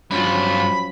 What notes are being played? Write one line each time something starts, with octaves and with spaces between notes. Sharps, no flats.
G2 F3 F#3 C#4 F4 B5